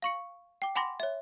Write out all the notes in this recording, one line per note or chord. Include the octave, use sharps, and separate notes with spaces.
F5 C#6 C#7
G5 D6
F#5 G#5 B5 C6 D6 A#6
C#5 E5